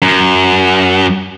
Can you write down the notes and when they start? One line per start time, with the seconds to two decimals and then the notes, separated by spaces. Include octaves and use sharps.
0.02 F#2